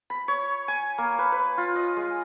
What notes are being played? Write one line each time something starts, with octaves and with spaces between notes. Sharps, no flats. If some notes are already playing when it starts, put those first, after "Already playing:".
B5
C#5
G#5
A#3
B4
B4
F4
D#5
G#3